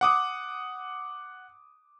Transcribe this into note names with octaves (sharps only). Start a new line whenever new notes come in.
F#5 D6 D#6